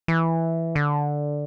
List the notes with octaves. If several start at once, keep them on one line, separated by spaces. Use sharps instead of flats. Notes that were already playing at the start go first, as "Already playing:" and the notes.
E3
D3